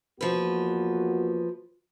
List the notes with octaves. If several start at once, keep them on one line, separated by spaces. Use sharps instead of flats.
E2 F3 A#3 F#4 B4